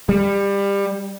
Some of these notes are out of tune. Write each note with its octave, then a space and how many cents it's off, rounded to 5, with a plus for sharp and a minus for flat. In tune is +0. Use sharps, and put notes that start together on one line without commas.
G3 +25